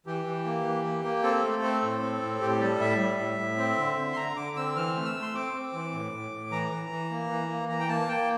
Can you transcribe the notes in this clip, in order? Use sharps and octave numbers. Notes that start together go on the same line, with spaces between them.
E3 G4
E3
A#3
E3
A#3
A#3
C4 A4
A3
C4
A2
C4
A2
A2 G4
G3 A4
A2 E5
G3
A2
A2
C4
D3
D3
C6
D3 A#5
D3 D6
C4 E6
E3 F6
A3
E6
A3
C6
C4 D6
C4
E3
A2
A2
A2
E3 A#5
E3
E3
A#3
E3
A#3
E3 A#5
G5
A#3 A5
A#3 G5